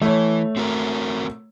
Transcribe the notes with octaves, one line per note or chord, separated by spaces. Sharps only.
E3 A3 C#5
C4 F#4 A#4